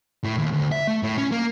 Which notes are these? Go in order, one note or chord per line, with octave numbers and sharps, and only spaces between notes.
A2
D#2
D2
E5
A3
A2
C#4
A#3